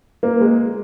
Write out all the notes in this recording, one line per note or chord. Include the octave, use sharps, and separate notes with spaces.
A#3
G#3